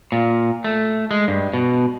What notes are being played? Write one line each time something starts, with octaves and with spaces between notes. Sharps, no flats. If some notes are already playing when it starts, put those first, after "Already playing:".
A#2
A3
G#3
G2
B2